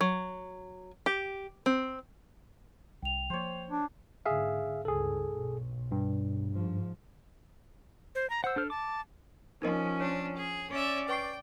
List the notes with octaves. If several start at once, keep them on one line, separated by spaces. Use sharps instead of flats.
F#3
G4
C4
C2 G5 F7
F3 F#3 A#3 C5 C#5
D4
G#2 D3 G#4 E5 F5
C#2 G2 G#4 A4
B1
G2
G#2 F3
C5
A#5
C5 F#5 E6
D4 A4 F6
A5 D6
F3 C#4 D#4 A#4 D#5
D4 C#5
G#4
C#4 D5 E5
B4 G5 C#6 C7